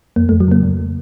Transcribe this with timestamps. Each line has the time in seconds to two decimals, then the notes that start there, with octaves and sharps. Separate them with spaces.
0.16 F2 A#3
0.29 F2 A3
0.40 F#3
0.48 C#3 A#3
0.63 F2